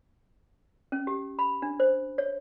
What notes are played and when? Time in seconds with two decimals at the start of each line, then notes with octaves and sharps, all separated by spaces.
0.92 C#4
1.07 G4
1.39 B5
1.62 D4
1.80 C5
2.18 C#5